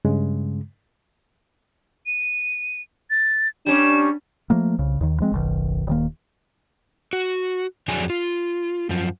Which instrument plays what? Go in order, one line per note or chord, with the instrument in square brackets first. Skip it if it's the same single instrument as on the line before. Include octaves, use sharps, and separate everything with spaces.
[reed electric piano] G2 C#3 G#3
[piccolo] D#7
A6
[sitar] G3 C#4 [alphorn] D4 [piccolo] E7
[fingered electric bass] F3 A3 A#3
C2 C#3
D#2 D#3
F3 G#3 C4
F#1 B1 D#3
D#1 D#3 A#3
[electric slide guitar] F#4
F2 D3 F#3 D4 G#4 G#5
F4
F#2 F3